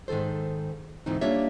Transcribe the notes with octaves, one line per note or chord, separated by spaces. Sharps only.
G#2 D#3 E3 A4 C5
D2 G#2 E3 C4 D#4
G3 A#3 D4 F4 C#5 E5